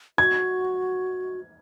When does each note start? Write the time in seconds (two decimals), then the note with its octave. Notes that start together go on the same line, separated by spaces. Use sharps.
0.18 F#4 G#6